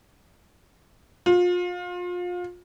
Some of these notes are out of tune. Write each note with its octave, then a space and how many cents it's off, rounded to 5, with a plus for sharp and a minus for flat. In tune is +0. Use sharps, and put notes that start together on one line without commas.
F4 +30